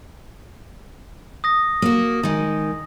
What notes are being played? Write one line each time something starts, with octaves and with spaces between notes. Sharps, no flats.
D#6 A#6
A#3 F#4
D#3 G#3